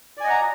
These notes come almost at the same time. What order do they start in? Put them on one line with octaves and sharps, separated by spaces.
D5 G#5 D#5 F#5 A#5